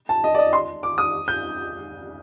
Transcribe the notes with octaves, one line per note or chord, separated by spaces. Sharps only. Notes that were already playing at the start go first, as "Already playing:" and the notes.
A5
D#5
D5
D#5
C6
D6
D#6
G6